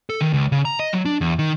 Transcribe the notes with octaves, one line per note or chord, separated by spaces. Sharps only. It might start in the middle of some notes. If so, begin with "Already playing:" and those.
A4
D#3
C#2
C#3
A#5
D#5
F#3
D4
E2
D#3